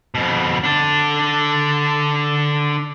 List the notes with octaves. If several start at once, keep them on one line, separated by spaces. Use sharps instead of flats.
F2 B2
D3 D4